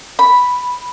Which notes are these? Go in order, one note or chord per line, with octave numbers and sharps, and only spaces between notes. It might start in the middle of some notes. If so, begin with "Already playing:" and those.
B5